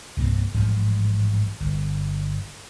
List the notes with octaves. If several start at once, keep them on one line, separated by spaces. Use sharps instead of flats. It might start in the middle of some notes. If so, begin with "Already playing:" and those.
C2 G2 A#3 C4
A1 G#2 F3 G3
G1